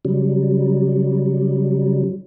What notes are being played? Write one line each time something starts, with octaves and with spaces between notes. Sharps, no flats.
C#3 F#3 G3